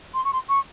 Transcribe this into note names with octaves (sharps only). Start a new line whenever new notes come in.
C6
C#6
C6
C#6